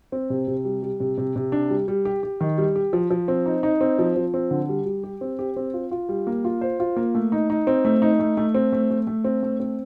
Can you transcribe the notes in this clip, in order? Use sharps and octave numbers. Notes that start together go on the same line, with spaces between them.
C4
C3
C3
G3
G3
C3
C3
C3
D4
G3
G3
G4
G4
D#3
G3
G4
F3
F3
C4
D#4
D#4
C4
F3
F3
C4
D3
G3
G3
G4
C4
G4
C4
F4
F4
G3
A#3
F4
C5
F4
A#3
A3
D#4
D#4
C4
A3
D#4
A3
A3
C4
A3
A3
A3
C4
A3
C4